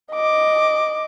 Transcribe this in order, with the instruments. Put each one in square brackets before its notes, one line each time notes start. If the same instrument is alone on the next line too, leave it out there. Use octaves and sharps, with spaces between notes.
[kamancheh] D#5 D6